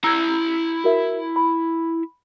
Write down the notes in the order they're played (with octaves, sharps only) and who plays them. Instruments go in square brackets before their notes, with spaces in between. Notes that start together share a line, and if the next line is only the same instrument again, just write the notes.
[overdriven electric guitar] E4 A#5 [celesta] E6 G#6
[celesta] F#4 A#4 E5
B5